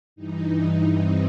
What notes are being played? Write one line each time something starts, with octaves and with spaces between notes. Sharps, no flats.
G2 E3 D#4
C4